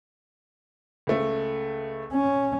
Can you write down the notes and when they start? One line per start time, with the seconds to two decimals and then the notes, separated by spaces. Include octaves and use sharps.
1.07 C#2 A3
2.13 C#4